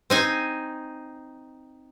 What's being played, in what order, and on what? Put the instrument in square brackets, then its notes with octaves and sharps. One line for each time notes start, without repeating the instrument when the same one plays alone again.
[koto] C4 D#4 G#5